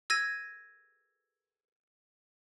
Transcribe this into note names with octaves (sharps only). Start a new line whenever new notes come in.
E6 G#6 A#6 D#7